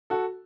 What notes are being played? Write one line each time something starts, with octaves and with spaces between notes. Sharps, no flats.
F#4 A4